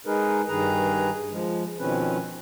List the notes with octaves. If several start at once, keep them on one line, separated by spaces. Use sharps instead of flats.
G#3 D#4 G#4 A#4 B4
G2 D#3 G#4 B4 A#5
F3 G#3
B2 D#3 F3 C4 C#4 B4